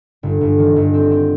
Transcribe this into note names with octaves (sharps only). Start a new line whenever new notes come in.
G1
G1
D#3
G1
C4
C4